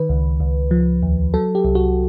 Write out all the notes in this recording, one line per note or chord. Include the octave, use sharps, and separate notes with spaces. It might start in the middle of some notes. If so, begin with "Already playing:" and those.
Already playing: D#3 B4
C#2
C#2
F3
D#2
F#3 A4
G4
C2
F#4